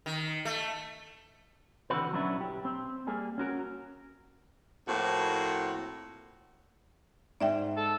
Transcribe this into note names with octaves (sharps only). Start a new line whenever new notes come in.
D#3
A3
B2 D3 E3 C4 F#4 B4
F#3 B3 C#4 D4 E4
B1 G4
C4
G3 A#3 G#4
C#4 F#4 A#4
A2 F3 A#3 C4 F#4
G#2 D5 E5 G5
A4